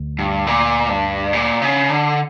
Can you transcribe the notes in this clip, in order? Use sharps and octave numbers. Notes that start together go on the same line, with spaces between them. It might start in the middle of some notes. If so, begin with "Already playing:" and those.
Already playing: D2
G2
A#2
G2
A#2
C#3
D3